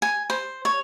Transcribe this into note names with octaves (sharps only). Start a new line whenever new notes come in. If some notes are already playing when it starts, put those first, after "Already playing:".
G#5
C5
C#5